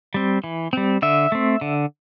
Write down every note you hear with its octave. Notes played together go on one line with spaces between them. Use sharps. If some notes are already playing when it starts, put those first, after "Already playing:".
G3 C4
E3
G3 C4
D3 E5
A3 C4
D3